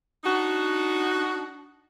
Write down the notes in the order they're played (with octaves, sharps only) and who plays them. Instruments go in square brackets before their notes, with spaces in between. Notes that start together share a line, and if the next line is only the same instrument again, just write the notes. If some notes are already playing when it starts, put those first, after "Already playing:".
[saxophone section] D4 D#4 F#4